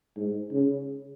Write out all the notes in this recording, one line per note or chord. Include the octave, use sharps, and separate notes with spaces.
G#2
C#3